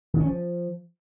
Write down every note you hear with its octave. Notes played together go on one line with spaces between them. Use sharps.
D#3
C#4
F3